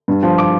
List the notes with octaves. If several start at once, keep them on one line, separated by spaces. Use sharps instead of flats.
G2
F3
D6